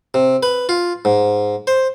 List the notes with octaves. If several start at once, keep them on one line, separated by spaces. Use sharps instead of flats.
C3
B4
F4
G#2
C5